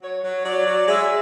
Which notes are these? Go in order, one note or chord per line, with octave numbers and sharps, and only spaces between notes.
F#3 C#5
F#3
F#3 D5
F#3
G#3 E5